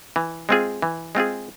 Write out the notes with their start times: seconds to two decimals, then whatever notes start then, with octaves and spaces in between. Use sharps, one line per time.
0.16 E3
0.49 G#3 C4 F4 G#4
0.82 E3
1.15 G#3 C4 F4 G#4